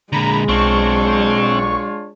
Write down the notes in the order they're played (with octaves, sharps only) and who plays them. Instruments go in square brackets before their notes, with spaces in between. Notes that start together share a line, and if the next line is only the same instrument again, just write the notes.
[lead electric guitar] A#2 D3 [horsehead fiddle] G#3 [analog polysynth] A#5 B5
[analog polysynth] B1 C#6 [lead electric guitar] C4 [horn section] D4 F4 C#5